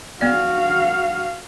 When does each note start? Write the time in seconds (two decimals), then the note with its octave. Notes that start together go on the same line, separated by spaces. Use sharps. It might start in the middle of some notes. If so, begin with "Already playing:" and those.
0.21 B3 F#4 D5 F5